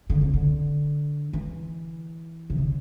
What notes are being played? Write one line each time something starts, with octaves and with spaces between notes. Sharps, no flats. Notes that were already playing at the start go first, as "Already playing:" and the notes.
D3
C3
D3
E3
C3
D3